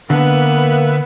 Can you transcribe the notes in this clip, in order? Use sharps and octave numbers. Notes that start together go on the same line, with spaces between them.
D3 A#3 B3 B4 E5